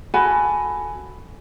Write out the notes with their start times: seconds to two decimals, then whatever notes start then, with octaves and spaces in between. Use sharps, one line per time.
0.14 F#4 A4 G#5 B5